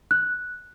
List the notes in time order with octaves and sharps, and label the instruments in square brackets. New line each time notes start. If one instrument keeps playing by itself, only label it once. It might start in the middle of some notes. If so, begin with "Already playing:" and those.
[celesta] F#6